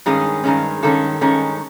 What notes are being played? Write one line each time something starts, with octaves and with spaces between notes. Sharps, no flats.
G2 D#3 G#3 C#4 G#4
G2 D#3 G#3 C#4
G2 D#3 G#3 C#4 A4
G2 D#3 G#3 C#4